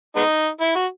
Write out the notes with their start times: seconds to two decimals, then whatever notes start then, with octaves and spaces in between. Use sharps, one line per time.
0.16 G#3 B3 D#4
0.61 E4
0.75 F#4